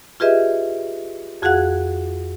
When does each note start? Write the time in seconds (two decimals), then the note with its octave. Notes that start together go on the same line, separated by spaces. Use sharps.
0.20 F4 G4 G#4 B4 D#5 E5
1.42 F2 F#4 G#4 F5 F#5 F#6